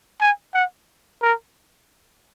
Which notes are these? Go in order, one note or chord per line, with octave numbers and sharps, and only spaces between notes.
G#5
F#5
A#4